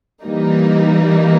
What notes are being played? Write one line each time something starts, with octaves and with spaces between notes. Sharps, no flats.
E3 G3 A#3 D#4